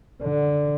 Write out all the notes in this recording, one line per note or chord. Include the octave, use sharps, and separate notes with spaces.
D3